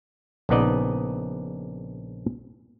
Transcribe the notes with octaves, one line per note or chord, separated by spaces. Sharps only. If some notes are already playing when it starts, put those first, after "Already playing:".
A#1 C#3 B3 D#4 D5 D#5